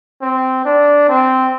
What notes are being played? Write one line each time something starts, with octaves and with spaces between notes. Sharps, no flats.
C4
D4
C4